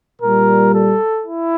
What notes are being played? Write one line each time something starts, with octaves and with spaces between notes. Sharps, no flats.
A#2 G3 A#4
A4
E4